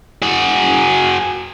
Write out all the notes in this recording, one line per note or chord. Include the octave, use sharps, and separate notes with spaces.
F#4 G#4